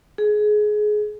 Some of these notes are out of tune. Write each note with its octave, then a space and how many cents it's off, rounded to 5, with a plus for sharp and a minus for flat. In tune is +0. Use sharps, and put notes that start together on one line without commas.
G#4 +20